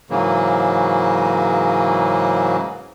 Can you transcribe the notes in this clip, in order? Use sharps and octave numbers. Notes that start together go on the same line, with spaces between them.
G#2 C#3 E3 F#3 A#3